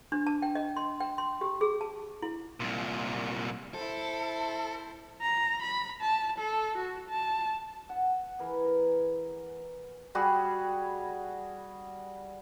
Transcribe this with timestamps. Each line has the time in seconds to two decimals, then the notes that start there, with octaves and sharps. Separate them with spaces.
0.12 D4
0.27 A5
0.42 G5
0.55 D#5
0.77 C6
1.00 G5
1.18 C6
1.41 G4
1.61 G#4
1.81 A5
2.22 E4
2.60 C2 A#2
3.74 E4 A4 C5
5.21 A#5
5.62 B5
6.01 A5
6.39 A4
6.78 F#4
7.09 A5
7.89 F#5
8.39 E3 G#4 A#4 B4
8.64 A#4
10.15 G3 F#4 G#4